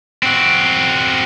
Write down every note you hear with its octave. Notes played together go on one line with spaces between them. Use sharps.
C4 F#4